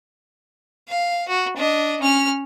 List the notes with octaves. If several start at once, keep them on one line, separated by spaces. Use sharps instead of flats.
F5
F#4
D4 D#5
C#4 F6